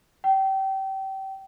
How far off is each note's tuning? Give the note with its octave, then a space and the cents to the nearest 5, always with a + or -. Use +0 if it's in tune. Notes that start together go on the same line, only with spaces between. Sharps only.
G5 -25